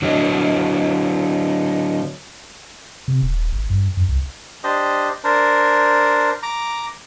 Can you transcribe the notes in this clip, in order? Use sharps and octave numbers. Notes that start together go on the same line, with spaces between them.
D3 F#3 D#5
C3
D#1
G#1
G2
F#2
C2
D4 G4 C5 D#5
D4 A#4 C5
A#5 D6